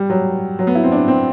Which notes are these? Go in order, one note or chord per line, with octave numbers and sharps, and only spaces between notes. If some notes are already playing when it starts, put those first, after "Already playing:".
Already playing: G3
F#3
F#3
B3
E4
C4
D4
C4